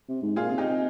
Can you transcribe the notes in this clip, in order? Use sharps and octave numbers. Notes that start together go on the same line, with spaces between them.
C3
G#2
A#2 F4 G#4
C3
D#4 G4
C3